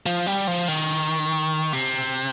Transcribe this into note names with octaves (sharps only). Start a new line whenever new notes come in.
F3
G3
F3
D#3
C3